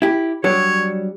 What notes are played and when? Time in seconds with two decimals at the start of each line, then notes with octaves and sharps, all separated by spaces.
0.02 E4 G4
0.44 F#3 G3 D4 C#5